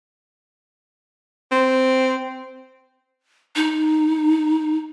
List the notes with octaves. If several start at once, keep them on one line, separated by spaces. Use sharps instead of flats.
C4
D#4